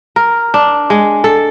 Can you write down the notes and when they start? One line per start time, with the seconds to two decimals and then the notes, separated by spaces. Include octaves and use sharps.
0.16 A#4
0.54 D4
0.90 G#3
1.24 A4